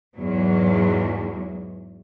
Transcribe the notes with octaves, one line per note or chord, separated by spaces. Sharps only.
E2 G#2 F#3